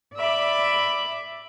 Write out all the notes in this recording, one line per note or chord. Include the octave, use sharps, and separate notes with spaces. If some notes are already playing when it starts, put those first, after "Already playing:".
D5 E5 B5 D6